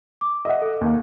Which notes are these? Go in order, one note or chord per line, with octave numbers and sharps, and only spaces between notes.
D6
D#5 E5 F#5
A4
D#2 A#3